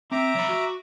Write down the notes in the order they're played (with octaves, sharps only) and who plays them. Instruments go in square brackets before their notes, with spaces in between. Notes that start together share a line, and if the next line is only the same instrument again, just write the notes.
[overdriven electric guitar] C4 [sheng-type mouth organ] E5 A#5 D6
[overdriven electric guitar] F#3 B5
F#4